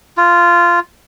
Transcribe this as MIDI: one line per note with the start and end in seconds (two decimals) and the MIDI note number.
0.17 0.79 65